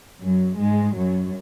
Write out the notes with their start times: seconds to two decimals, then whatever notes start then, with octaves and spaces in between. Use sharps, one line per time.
0.21 F#2 F#3
0.59 G#2 G#3
0.96 F#2 F#3